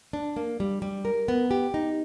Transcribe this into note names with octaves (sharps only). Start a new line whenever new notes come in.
D4
A#3
G3
G3
A#4
B3
G4
D#4